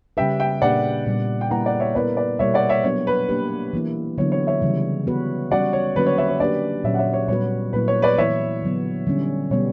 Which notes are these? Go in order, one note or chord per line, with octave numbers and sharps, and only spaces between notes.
C#3 G3 C#4 G4 B4 E5 G5
E5 G5
A#2 A#3 D4 G4 B4 D5 F#5
A#2 G3 B3
G5
G3 A#3 E4 B4 F#5 A#5
D5 F#5
C#5 E5
B3 E4 A#4 B4 D5
B4 D5
B2 G3 A#3 E4 A#4 C#5 E5
D5 F#5
C#5 E5
F#3 B3 D4 C#5
B4
A#3 D4 G4 B4
E3 A#3 E4
D3 F#3 B3 E4 C#5
C#5
C#5 E5
C#3 E3 G3
B3 F#4 B4
G3 C#4 F#4 D5 F#5
C#5
D3 F#3 A#3 C#4 F#4 B4
C#5
C#5 E5
C#5
A#3 D4 G4 B4 D5
A#2 F#3 C#4 C#5 E5
F#5
C#5 E5
C#5
A#2 G3 B3 F#4 B4 C#5
A#2 F#3 A#3 E4 B4
C#5
B4 D5
E3 B3 E4 C#5 E5
D3 F#3 B3
D3 G3 C#4
B2 G3 B3 C#5